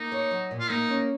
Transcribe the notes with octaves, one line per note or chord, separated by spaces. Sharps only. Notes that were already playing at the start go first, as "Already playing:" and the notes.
Already playing: A#3 D#4
C#5
F#3
A#2
F4
A#3 D#4
C#4